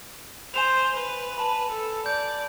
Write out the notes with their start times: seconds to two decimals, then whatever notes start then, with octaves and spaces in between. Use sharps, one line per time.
0.54 C5 G#5 E7 F7
0.96 B4
1.38 A5 B5
1.71 A4
2.06 D5 G6